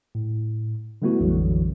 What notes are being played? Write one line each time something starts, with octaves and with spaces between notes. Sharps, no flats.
A2
D3 G3 A3 B3 E4 F#4
A#1 F2 D3 E3 F#3